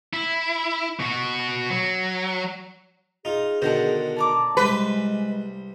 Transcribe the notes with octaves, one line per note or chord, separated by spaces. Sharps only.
E4
B2 F#4
F#3
D#4 F4 G#4
B2 D3 D#3 C5 F#5 A5
D5 A5 A#5 D6
C2 G#3 B4 C5 B5